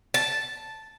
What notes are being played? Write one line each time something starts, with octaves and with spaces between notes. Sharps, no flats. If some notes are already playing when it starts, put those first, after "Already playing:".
A5